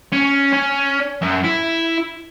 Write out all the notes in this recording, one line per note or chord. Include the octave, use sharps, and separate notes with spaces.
C#4
C#4
F#2
E4